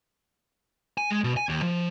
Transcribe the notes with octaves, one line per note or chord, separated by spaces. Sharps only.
G#5
G#3
B2
G#5
D#2
F3